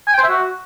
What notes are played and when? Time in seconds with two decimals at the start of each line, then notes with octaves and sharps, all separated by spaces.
0.07 G#5
0.13 G5
0.18 C5
0.24 E5
0.29 F#4